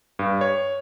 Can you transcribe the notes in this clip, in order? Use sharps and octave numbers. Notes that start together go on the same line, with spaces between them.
G2
C#5